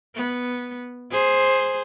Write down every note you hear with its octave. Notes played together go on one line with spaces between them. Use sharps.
B3
G#4 C5